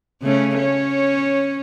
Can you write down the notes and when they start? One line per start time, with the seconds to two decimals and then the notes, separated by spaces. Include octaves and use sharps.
0.22 C#3 A3 C#4
0.58 C#4 C#5